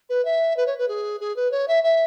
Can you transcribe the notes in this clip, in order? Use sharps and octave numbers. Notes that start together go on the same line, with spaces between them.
B4
E5
B4
C#5
B4
G#4
G#4
B4
C#5
E5
E5